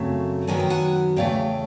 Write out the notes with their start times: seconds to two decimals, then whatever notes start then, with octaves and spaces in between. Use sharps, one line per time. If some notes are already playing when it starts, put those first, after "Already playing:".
Already playing: F#2 C#3 F#3 A3 C4
0.47 F#2 D#3 F#3 B3 G#5
0.60 G5
0.70 F#5 G#5
1.16 E2 C#3 A3 F5 G5